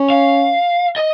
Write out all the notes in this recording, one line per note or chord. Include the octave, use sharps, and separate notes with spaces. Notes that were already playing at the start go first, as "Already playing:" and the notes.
Already playing: C#4
F5
D#5